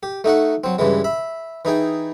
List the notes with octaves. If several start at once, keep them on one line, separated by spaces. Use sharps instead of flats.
G4
A3 D#4 F#4 F#5
F#3 C4
G2 C#3 E3 G#3
E5 B5
E3 D#4 G#4 G5